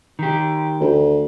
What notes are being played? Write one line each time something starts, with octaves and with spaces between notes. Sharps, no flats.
D#3 G4
D2